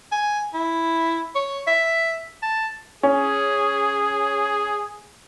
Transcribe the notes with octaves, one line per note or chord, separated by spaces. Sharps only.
G#5
E4
C#5
E5
A5
C#4 G#4